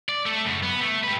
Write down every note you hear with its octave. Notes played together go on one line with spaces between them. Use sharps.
D5
A3 A4
F#2 C#3
B3
A3
G4 B4